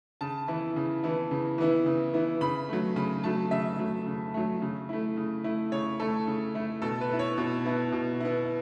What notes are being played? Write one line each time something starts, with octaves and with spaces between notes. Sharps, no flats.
C#3 A5
E3 B3 E4
C#3
E3 B3 E4
C#3
E3 B3 E4
C#3
E3 B3 E4
C#3 B5
F#3 A3
C#3 B5
F#3 A3 A5
C#3 E5
F#3 A3
C#3
F#3 A3
C#3
A3 E4
C#3
A3 E4
C#3 C#5
A3 E4 A4
C#3
A3 E4
B2 A4
B4
B3 E4
C#5
B2
B3 E4
B2
B3 E4